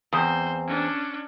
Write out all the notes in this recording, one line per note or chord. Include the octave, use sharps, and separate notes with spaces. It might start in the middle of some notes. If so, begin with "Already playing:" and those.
E2 C4 C5
C#4 D4